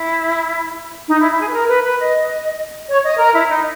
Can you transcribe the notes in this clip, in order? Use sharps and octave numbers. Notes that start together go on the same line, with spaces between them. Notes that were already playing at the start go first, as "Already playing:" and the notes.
Already playing: E4
D#4
E4
E4
G#4
B4
A#4
B4
B4
D#5
C#5
D#5
A#4
E4
D#4